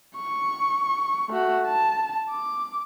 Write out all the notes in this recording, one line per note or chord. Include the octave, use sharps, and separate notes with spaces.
C#6
A3 F#4
A5
D6